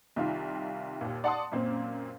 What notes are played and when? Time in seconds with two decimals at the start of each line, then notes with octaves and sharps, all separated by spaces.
0.16 C2 D#3 F4
1.01 D#2 A#2
1.24 D5 F#5 A5 C6 D#6
1.52 F#2 A#2 A#3 C4